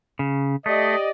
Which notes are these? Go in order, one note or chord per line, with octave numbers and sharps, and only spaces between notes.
C#3
A3 G4 D5 D#5